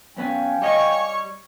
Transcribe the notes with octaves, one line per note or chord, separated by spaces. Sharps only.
F#2 B3 C#4 F5 G5 G#5
G3 C#5 D#5 C#6